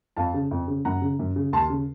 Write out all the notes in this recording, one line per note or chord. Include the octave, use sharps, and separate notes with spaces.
F2 F5 A5
C#3
F2
C#3
F#2 F#5 A#5
C#3
F#2
C#3
D#2 A5 C6
C#3